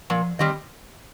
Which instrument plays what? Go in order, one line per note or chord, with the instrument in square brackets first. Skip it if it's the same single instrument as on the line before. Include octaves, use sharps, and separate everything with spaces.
[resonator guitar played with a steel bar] A#2 [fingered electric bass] F3
[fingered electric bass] D#3 [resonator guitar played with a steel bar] G3 C4 G4 D#5